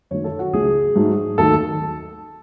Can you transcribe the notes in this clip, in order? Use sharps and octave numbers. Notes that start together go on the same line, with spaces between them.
F#2 D#3 F#3 A3 C#5
A4
F#4
C#2 C#3 F#3 A3 G#4
G#2 F#3 A3
D#2 D#3 F#3 A3 A4